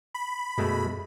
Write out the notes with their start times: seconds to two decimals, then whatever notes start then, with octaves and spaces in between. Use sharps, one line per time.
0.14 B5
0.58 F#2 B2 G#3 A3